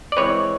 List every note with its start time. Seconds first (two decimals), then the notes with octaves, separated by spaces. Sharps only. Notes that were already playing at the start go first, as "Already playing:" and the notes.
0.12 D5
0.17 E3 G#3 C4 B4 C#5